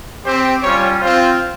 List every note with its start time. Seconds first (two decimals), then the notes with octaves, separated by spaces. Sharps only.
0.24 C4 G4 C5
0.63 G3 C#4 F4 C#5
1.01 C4 F4 C5